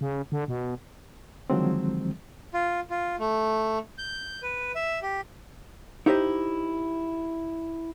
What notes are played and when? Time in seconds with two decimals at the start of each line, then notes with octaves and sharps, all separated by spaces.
0.01 C#3
0.32 D3
0.48 B2
1.50 D3 D#3 F3 F#3 G#3 C4
2.54 F4
2.90 F4
3.19 A3
3.98 G6
4.42 B4
4.75 E5
5.02 G4
6.06 D#4 E4 G4 C5 D5 D#5